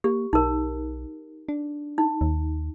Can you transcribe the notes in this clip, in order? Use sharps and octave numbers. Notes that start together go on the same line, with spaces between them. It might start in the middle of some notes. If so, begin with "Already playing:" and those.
A#3 G4
B1 D#4 A#4
D4
D#4
D#2